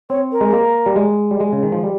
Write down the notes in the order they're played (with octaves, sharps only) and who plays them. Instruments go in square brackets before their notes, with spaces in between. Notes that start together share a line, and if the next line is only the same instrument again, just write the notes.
[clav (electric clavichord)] C4 [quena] C#5
[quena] A#4
[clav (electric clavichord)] G#3
A#3
G3
G#3
G3
G#3
C#3
D#3
F3
G3